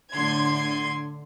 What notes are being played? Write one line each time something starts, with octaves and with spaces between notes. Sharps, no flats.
A2 D3 C6 G#6